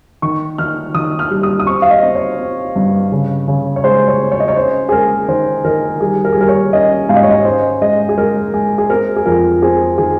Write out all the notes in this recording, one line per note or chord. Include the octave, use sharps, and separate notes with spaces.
D#3 C#6
D#3 F6
D#3 D#6
F6
G3
D#6
D#6
C4 C#6
F5
D#5
C4
C#5
C4
G2
C#3
C#3
C#5
G#3 C5
C#5
C4
C#5
D#5
C#5
C#4 C5
G#4
G#3 A#4
D#3 C5
D#3 A#4
G3 G#4
A#4
G#4
G3 A#4
C#5
C#4 D#5
G#2 F5
D#5
C#5
D#5
C#4 C5
G#3 D#5
G#4
G#3 A#4
G#3 G#4
G#4
C4 A#4
G#4
F2 A#4
C4 G#4
D#3 G#4